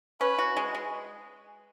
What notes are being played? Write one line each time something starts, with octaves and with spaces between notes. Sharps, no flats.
C#4 B4
F#4
G#3
G#3